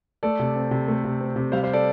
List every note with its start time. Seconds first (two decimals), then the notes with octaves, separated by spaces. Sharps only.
0.23 A3 A4 D5
0.39 C3
0.56 C4
0.71 C3
0.88 A3
1.05 C3
1.20 C4
1.36 C3
1.52 G3 C5 F5
1.63 C5 F5
1.73 A4 D5